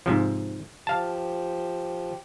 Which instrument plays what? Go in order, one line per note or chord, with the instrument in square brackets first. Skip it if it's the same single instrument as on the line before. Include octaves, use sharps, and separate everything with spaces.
[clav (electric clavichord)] G#2 C3 F3
[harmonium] F3 G4 [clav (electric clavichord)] F5 A5